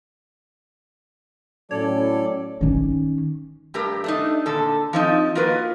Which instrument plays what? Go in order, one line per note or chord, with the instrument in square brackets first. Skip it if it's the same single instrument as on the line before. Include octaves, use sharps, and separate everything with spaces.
[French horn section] A2 F#3 C#4 [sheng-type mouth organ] A4 D5 [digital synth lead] C#5
[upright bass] D#3 C#4
[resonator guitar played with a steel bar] G2 A3 G4 A#4
A3 D4 D#4
A#2 D3 A4
F3 C4 D#4
A#3 F4 F#4 A#4 B4